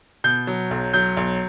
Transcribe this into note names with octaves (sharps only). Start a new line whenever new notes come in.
B2 G6
F#3
B1
F#3 G6
B1